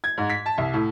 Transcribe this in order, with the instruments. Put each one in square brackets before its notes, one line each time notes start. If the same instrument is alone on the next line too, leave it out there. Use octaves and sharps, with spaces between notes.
[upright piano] G#6
G#2
B6
A5
C2
A2